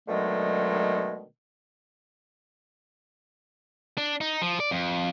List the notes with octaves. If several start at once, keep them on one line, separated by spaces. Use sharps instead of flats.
B2 D3 D#3 F#3 G#3 A3
D4
D#4
F3
D5
F2